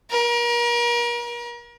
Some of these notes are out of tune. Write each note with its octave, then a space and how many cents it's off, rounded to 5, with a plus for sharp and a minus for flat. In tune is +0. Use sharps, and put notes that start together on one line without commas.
A#4 +35